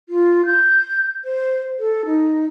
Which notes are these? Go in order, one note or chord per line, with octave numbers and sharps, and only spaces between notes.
F4
G6
C5
A4
D#4